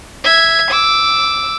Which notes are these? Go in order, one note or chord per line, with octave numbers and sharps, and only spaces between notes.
E5 G#6
D6 E6